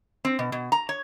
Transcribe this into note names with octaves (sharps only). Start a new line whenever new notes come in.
C4
B2
B2
A#5
C#5